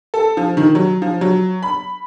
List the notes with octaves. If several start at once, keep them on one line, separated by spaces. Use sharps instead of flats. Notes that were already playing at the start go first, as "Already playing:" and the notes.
A4
F3
D#3
F#3
F3
F#3
B5